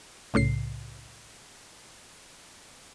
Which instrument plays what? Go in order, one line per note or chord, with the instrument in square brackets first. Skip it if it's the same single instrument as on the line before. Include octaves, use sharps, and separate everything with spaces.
[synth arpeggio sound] C2 A2 C#3 C7